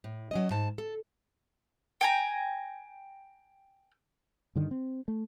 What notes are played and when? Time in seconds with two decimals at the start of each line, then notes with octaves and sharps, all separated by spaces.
0.04 A2
0.31 F#3 C#4 D#5
0.51 G#2 A5
0.78 A4
2.01 G5 G#5 A#5
4.55 G2 D3 D#3
4.71 C4
5.08 A3